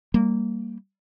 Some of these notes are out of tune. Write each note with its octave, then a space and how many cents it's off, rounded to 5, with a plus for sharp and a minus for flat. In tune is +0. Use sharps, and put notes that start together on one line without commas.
G3 +0 A#3 -15